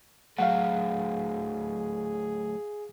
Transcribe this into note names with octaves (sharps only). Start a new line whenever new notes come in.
A2 F#3 G#4 F5 F#5